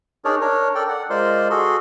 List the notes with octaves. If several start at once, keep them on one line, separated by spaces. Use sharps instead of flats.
D4 D#4 G#4 A#4 C#5 D5
D4 A#4 C#5
A4 A#4 D5 G5
D5 F#5
G#3 F4 A#4 C5 D5 C6
F#4 G#4 A4 C6